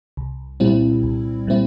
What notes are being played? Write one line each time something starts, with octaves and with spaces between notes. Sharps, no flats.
C2
A#2 G3 C4 E4
C2
A#2 G3 C4 E4